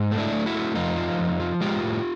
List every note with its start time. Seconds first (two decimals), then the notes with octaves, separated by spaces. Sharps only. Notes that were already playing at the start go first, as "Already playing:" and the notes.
Already playing: G#2
0.11 A3
0.18 D4 E4
0.32 A3
0.46 E4 F#4
0.54 A3
0.75 F2 D#4 F4
0.97 F3
1.19 F2
1.40 F3
1.61 G#3 F4 G4
1.83 A2